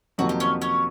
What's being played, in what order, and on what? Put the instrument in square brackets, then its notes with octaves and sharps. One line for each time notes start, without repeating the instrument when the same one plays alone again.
[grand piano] F2 C3 D#3 F#3 A#3 [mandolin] F#4
[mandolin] G4
C#4 C#5
C#4 C#5